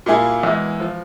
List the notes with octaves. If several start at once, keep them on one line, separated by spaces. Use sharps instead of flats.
A#2 G3 A#3 E4 G#4
E2 E3 G#3 E4
F3